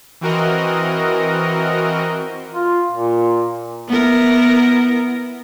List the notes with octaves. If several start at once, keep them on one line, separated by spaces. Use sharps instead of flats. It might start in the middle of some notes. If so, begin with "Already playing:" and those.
E3 C4 F#4 A#4 D#5
F4
A#2
B3 E4 A#4